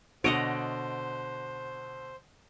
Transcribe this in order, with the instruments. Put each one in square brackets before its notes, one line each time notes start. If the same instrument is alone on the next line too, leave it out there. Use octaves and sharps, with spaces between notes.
[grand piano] B2 D3 D7 [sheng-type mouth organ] C5 [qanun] C#5 D#5 F#5